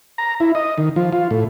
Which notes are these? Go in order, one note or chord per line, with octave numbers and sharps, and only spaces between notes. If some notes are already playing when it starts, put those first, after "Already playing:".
A#5
E4
D#5
D#3
F3
F4
A2